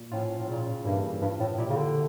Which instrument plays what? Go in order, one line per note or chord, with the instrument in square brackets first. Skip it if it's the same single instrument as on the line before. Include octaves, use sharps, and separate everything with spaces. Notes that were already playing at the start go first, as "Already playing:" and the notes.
Already playing: [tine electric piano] A#2
[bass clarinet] A2 [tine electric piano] F3 C#4 F4
[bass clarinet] A2
[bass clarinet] A#2 [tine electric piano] C#3
[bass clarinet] G2 [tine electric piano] E3 G3 A#3 E4
[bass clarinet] G2 [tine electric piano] F3
[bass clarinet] A2
[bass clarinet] A#2 [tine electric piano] A#3 E4 G4
[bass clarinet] C#3
D3